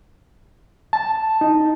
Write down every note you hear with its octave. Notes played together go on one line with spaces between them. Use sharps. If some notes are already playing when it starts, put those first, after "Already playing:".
A5
D#4